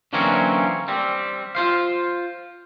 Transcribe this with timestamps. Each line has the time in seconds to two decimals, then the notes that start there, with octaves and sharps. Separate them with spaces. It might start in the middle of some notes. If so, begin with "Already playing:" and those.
0.13 D3 E3 F#3 A#3 C4 C#4
0.88 G3 C4
1.55 F4 C5 F5